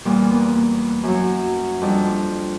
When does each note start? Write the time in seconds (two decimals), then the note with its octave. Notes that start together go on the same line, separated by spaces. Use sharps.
0.05 E2 A#2 G3
0.31 A#3 B3
1.03 F#2 F#3
1.82 F2 G3 D4